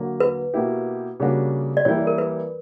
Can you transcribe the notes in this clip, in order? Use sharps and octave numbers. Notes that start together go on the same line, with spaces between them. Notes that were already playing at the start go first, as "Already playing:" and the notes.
Already playing: D3 F#3 A#3
B4
B2 A#3 E4 G4
C#3 G3 A#3 D4 F#4
D5
E3 G3 A#3 E4 G4 C#5
A#4
B4